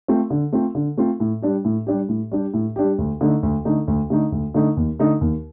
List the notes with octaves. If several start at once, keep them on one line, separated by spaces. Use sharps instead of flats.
A3 C4 F4
D3
A3 C4 F4
D3
A3 C4 F4
A2
G3 D4 G4
A2
G3 D4 G4
A2
G3 D4 G4
A2
G3 D4 G4
D2
D3 A3 D#4
D2
D3 A3 D#4
D2
D3 A3 D#4
D2
D3 A3 D#4
D#2
D3 A3 D#4
D#2